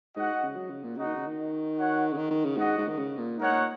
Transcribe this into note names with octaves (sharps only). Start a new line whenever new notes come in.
G#2 F#4 D#5 F#5
C#3
F#3
C#3
A#2
C#3 D#4 F#4 D#5 F#5
D#3
C#3
D#3
F#4 C#5 F#5
C#3
D#3
D#3
C#3
G#2 F#4 D#5 F#5
G#2
D#3
C#3
A#2
G#2 D#4 A#4 C#5 F#5
A#2